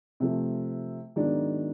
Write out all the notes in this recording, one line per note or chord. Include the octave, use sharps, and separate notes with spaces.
C3 F3 A3
G#2 D#3 F#3 B3 D4